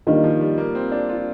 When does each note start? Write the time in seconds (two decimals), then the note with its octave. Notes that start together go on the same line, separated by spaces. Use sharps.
0.07 D#3 G3 A#3 D4 F4
0.24 F3
0.41 G3
0.58 A#3
0.75 C4
0.92 D4
1.09 F4